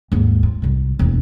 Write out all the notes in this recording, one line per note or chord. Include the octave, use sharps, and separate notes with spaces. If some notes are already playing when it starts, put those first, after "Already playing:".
D#2 G#2
F4
C2 G#2
E1 D#2